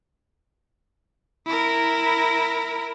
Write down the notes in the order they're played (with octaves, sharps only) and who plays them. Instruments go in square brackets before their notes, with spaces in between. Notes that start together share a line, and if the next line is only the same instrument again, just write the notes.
[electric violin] E4 A#4